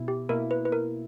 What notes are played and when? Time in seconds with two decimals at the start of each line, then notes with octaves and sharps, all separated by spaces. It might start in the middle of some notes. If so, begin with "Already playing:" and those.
Already playing: B2 E4
0.08 G4
0.29 B2 A#3 E4 A#4
0.51 B4
0.65 B4
0.72 A#4